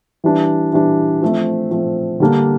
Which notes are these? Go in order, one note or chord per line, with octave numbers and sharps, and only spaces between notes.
E3 G3 D4
E3 G3 D4
F3 A3 C4
F3 A3 C4
D3 G3 A#3 D4